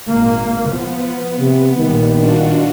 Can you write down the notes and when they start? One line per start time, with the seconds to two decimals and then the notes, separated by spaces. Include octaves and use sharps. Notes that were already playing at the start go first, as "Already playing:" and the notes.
0.11 G#1 A#2 A#3
0.71 F3 B3
1.39 C3
1.78 A#1 A#2 D#3 G3
2.15 D4 F4 F#4